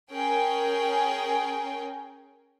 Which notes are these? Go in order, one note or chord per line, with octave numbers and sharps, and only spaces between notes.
C#4 G#4 A#4 G5